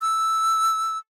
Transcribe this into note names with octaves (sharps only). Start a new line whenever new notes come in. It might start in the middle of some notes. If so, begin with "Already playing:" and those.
E6